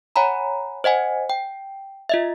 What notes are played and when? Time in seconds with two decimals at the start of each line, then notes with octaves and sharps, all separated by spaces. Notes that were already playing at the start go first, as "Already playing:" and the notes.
0.16 C#5 F#5 G#5 A#5 B5
0.84 C5 D#5 F#5 G#5
1.30 G5
2.09 F4 D#5 E5